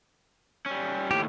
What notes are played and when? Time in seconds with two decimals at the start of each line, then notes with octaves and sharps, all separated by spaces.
0.66 G3 C#4
1.11 D#2 A2 G4